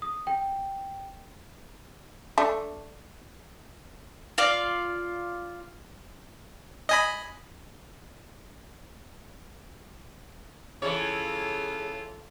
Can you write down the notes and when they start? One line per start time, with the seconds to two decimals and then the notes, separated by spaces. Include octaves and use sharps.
0.02 D#6
0.27 G5
2.38 A3 D4
4.38 F4 D5 F5
6.89 D#5 G#5 B5
10.82 C#3 E3 F4 A4 C#5